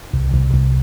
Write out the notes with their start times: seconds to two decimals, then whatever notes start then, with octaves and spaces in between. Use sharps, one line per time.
0.13 C2
0.34 C2
0.54 C2